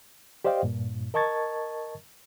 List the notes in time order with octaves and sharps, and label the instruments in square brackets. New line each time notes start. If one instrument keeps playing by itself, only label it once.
[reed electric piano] G4 C5 D5 D#5 F5 G5
G2 A#2
A#4 D#5 A5 C#6 G#6 A6